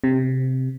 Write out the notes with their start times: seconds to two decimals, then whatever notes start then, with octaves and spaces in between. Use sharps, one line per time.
0.04 C3